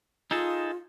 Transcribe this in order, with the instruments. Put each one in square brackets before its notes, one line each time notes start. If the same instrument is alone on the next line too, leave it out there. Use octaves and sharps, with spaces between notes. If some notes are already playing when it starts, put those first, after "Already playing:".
[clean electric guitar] D#4 G#4 A4 [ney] F4